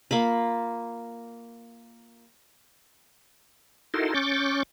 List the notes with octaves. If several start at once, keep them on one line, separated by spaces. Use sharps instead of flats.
A#3 F4 B5
D#4 E4 F#4 A4 A#4 C6
C#4 C#6 D6 G6 A6